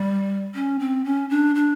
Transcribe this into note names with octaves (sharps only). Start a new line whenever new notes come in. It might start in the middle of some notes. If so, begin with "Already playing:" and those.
Already playing: G3
C#4
C4
C#4
D4
D4